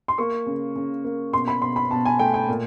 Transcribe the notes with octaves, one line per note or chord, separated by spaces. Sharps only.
C6
A#3 C#6
C#3
C#3
A#3
B2 C6
B5
B2 C6
B5
B2 A5
G#5
A3 G5
G5
A#2